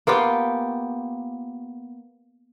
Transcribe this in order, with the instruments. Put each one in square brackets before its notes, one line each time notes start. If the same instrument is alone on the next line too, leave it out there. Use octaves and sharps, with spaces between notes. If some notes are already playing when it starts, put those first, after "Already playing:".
[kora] A#3 B3 F4 G4